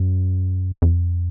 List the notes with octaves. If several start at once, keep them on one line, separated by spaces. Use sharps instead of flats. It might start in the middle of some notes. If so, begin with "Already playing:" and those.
Already playing: F#2
F2